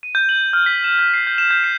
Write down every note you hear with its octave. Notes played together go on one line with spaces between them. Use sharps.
D#7
G6
F#7
F6
B6
E7
G6
C7
G6
E7
G6
C7